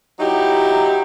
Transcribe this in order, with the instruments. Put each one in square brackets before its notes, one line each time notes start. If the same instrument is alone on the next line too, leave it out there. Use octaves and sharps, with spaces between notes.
[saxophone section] F#3 D#4 E4 G4